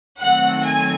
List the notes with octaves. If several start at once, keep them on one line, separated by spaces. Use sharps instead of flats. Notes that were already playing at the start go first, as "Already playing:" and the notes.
D#3 F#3 A3 C4 F#5
G#5